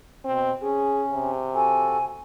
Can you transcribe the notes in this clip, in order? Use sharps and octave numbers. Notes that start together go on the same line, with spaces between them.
B2 C4
C#4 G#4
C3
F#4 A4 G#5